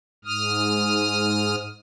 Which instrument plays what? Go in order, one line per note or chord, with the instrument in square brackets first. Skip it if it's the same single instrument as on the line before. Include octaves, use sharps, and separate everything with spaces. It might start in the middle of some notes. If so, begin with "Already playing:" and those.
[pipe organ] G#2 D#6 F6